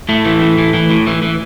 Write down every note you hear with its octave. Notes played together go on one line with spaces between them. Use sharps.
A2 A3
E3
A2
E3
E3
A2
E3
E3